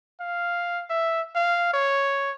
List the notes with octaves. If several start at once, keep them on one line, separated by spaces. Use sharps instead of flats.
F5
E5
F5
C#5